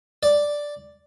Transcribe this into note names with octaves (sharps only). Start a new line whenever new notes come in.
D5